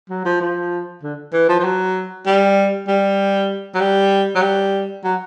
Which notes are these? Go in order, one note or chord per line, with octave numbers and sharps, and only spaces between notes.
F#3
F3
F3
D3
E3
F3
F3
F#3
G3
G3
F#3
G3
F#3
G3
F#3